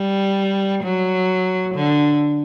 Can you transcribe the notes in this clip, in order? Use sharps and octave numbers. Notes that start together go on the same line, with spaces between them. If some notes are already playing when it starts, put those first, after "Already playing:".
Already playing: G3
F#3
D3